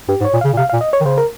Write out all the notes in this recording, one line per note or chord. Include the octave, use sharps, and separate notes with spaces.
G2 G4
G#2
C#5
A#2
C#3 F5
A#2
C3 F5
F5
A#2
D#5
C#5
D#3
C#3 C5
A#4